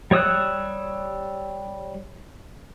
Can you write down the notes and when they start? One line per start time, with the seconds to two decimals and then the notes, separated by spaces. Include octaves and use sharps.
0.11 G3 C#5 D#6 E6 F#6